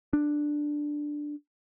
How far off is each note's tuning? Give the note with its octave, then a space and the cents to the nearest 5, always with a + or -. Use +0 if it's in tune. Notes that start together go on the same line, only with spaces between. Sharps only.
D4 +5